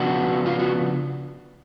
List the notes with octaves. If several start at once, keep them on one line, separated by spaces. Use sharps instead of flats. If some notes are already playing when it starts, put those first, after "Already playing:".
Already playing: C#3 F3 B3 D4 F#4
F4
F#4